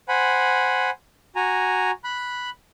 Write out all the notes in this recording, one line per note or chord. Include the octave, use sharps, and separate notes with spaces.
C5 F#5 G#5 B5
F#4 G#5 A#5
B5 F#6